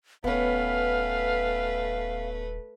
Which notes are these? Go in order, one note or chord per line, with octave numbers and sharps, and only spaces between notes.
D#1 A3 B3 C#4 B4 F5